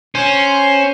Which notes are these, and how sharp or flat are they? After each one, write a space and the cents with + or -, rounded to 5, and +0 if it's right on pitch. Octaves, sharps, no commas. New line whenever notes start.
C#4 +0 C5 +10